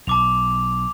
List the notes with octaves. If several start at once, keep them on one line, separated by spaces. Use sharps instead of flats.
B1 A5 D6 F7